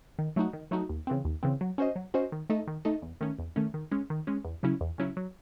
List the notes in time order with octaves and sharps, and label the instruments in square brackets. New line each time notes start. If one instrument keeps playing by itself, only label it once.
[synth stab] D#3
F#3 A3 D#4 F#4
D#3
F#3 A3 D#4 F#4
D#2
C#3 E3 C4
D#2
C#3 E3 C4
F#3
C#4 F#4 C5 D#5
F#3
C#4 F#4 C5 D#5
D#3
A3 D#4 A4 D#5
D#3
A3 D#4 A4 D#5
E2
D#3 A3 C#4
E2
D#3 A3 C#4
D#3
G#3 C#4
D#3
G#3 C#4
E2
C#3 F#3 C#4 E4
E2
C#3 F#3 C#4 E4
F#3